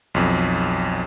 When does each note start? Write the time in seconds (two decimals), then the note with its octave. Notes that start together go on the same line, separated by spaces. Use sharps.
0.14 B1 F2